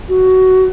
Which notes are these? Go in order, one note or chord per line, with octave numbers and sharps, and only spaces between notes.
F#4